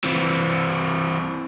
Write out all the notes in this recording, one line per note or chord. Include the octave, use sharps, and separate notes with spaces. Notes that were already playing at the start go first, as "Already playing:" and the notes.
E3 C4